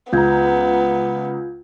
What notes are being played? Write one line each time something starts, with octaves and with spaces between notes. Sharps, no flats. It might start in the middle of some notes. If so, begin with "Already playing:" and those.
C#2 B3 F4 A#5 G6 G#6